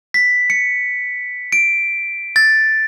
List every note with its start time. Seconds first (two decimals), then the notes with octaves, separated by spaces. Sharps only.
0.14 B6
0.50 C#7
1.52 D7
2.36 A6